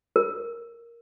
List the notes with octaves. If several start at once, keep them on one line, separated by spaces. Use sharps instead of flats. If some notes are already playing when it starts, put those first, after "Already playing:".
A#4